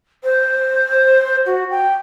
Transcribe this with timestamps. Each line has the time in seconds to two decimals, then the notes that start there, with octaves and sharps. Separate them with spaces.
0.24 C5
1.46 F#4
1.70 G5